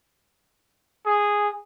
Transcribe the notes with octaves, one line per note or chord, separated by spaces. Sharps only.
G#4